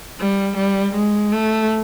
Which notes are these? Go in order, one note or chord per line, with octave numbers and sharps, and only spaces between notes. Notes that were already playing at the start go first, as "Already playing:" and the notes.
G3
G3
G#3
A3